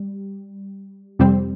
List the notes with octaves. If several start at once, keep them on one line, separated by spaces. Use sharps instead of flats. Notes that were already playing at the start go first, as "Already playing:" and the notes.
Already playing: G3
F2 C3 G3 C4